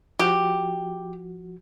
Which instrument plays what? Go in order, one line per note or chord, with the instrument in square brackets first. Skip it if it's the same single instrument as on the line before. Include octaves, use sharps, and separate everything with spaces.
[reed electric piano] F3 F#4 [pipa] G4